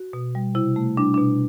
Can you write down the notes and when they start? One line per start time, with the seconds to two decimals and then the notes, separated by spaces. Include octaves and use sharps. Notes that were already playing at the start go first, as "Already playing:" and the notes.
Already playing: F#4
0.13 B2
0.35 G3
0.55 C3 E4
0.76 A3
0.97 G3 D4
1.14 B2 D4